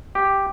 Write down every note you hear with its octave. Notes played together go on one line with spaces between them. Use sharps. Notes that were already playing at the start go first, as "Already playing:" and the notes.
G4